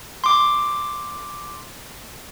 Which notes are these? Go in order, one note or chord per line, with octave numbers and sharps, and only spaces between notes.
C6 D6